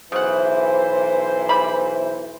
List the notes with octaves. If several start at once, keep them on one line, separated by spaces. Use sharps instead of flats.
B1 C#3 E3 C5 F#5
G3 B5